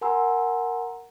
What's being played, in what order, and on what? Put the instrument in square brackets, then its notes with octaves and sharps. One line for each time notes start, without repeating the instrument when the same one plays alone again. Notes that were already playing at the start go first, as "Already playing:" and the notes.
[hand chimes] A#4 F#5 G#5 A#5 C6 E6